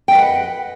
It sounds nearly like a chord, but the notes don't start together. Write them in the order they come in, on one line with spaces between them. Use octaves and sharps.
G5 D#5 B4 F#5